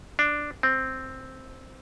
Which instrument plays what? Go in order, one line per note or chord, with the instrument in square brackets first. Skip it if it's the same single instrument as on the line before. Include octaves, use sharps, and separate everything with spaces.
[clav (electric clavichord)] D4
C4